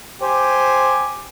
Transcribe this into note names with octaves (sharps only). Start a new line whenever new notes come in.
G4 C5 G#5